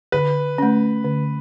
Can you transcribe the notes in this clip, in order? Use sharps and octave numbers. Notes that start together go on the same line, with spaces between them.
D3 B4
A3 C#4
D3